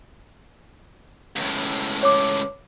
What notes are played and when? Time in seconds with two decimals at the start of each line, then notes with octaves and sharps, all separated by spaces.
1.36 C#2 A2
2.03 C#5 D6